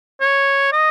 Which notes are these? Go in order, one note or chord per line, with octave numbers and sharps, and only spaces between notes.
C#5
D#5